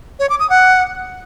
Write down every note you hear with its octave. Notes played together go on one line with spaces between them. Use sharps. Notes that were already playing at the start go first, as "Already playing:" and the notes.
C#5
D6
D#6
F#5